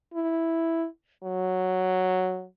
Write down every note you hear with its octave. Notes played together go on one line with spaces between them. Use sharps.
E4
F#3